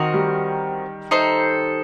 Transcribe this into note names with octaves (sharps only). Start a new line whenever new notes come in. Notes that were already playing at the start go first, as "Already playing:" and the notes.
Already playing: D#3 C4 F#4 A#4 D#5
G3
D#4 A4 C5